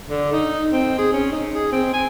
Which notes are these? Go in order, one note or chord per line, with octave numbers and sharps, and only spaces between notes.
D3
D#4
C4
G#4
C#4
D#4
G#4
C4
G#5